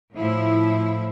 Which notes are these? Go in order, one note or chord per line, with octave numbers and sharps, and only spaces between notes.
A2 F3 E4